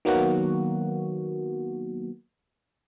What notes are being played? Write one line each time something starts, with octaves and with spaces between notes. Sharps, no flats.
D#3 F#3 A#3 B3 F#4